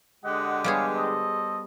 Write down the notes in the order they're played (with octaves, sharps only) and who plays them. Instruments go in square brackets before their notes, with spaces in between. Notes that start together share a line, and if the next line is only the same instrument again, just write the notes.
[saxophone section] D3 G#3 G4 [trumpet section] D#5 F#5
[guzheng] G3 B3 G#4 [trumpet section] C#5 D5 F5
[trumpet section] A4 C5 D#5